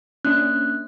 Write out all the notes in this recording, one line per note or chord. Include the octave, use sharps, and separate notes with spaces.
A#3 C#4 D4 F#6